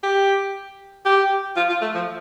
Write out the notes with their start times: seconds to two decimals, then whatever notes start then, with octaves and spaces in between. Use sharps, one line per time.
0.03 G4
1.05 G4
1.56 F4
1.69 F4
1.81 A3
1.94 F3